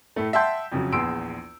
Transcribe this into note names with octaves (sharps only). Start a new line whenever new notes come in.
A2 A3
E5 F#5 G5 A5 C6 G6
F2 C#3 F#3
A#1 E2 G#4 C6 E6 D7